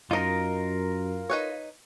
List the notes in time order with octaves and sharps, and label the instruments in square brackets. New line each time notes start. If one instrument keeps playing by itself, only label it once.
[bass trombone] F#2 [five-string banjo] D#4 D#5 [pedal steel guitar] F4 A#4 A#5
[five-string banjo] D#4 B4 C#5